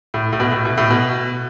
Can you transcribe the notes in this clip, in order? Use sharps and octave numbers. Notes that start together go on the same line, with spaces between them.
A2
A2
B2
A2
B2
A2
B2